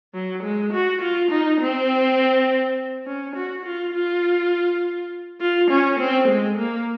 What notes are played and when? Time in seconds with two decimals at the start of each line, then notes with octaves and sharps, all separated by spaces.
0.14 F#3
0.43 G#3
0.73 F#4
1.01 F4
1.31 D#4
1.60 C4
3.07 C#4
3.35 F#4
3.65 F4
3.94 F4
5.41 F4
5.70 C#4
5.99 C4
6.28 G#3
6.58 A#3